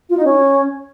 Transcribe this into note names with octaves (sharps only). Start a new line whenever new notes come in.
F4
D#4
C#4